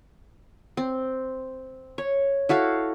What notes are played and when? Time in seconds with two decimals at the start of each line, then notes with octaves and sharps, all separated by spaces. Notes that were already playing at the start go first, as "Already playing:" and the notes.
0.77 C4
1.98 C#5
2.49 E4 F#4 A4 F5